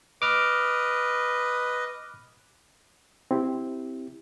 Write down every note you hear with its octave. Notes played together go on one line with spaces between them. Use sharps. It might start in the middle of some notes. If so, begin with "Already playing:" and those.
B4 D#5 D6 F6
C4 E4 G4